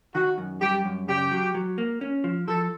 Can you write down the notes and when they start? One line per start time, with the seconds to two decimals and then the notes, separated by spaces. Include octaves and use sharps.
0.15 D#3 F#4
0.38 F#2
0.61 G3 G4
0.85 F#2
1.08 C#3 G4
1.31 F#3
1.55 F#3
1.78 A#3
2.01 C#4
2.24 F3
2.47 F3 A4